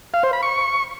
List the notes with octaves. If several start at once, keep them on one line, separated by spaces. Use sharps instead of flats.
F5
C5
B5
C#6